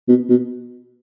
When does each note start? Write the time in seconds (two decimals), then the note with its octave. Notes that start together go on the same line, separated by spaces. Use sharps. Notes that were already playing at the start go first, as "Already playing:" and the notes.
0.08 B2
0.29 B2